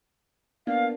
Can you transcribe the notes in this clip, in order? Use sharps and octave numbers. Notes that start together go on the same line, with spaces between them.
A#3 B3 D4 F5